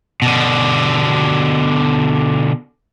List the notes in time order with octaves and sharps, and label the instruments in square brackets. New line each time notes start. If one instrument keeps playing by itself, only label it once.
[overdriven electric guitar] B2 D3